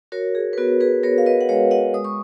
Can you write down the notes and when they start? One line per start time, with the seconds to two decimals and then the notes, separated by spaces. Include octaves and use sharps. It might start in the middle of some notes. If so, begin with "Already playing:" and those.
0.12 F#4 A#4 C#5
0.35 G#4
0.53 B4
0.57 B3 F#4 A#4
0.80 G#4 B4
1.03 B3 A#4 C#5
1.18 F5
1.26 B4 D#5
1.41 F#5
1.49 G#3 C#5 F5
1.71 D#5 F#5
1.94 G#3 D#6
2.05 C#6